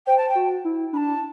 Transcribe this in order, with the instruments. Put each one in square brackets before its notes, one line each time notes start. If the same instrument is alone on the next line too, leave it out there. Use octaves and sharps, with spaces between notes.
[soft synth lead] C5 [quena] G5
[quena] A5
G5
[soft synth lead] F#4
E4
[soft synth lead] D4 [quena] B5
[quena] A5